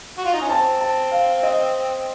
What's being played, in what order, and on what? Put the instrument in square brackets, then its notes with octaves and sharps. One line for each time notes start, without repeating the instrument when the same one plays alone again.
[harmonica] F#4
F4
D#4
C#4
[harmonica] C4 [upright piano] A5
[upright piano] A5
F5
D#5